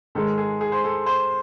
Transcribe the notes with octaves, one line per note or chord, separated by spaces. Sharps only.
G#2 D#3 G#3 A4
G#4
G#4
C5
A4
C5